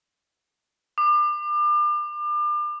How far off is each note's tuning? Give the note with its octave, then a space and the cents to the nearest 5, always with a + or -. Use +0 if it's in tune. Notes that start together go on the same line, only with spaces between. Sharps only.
D6 +35